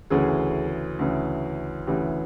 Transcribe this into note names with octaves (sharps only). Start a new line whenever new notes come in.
D2 C#3 E3 G#4
D2 C#3 E3
D2 C#3 E3 G4